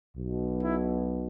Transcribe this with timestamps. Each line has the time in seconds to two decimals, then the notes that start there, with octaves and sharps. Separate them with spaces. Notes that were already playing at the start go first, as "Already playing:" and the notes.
0.15 B1 B2
0.62 E4